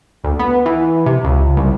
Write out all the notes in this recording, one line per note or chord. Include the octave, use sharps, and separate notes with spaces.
D2
B3
E3
C3
C#2
C2